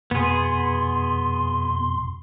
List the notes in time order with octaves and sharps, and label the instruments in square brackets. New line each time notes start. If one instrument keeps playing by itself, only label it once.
[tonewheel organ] F2 B2 C6 [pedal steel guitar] B3 G#4